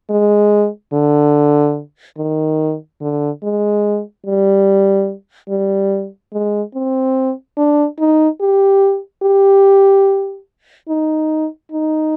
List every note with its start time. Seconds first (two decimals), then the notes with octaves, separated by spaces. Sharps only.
0.10 G#3
0.93 D3
2.17 D#3
3.01 D3
3.43 G#3
4.26 G3
5.49 G3
6.33 G#3
6.74 C4
7.57 D4
7.99 D#4
8.41 G4
9.23 G4
10.89 D#4
11.72 D#4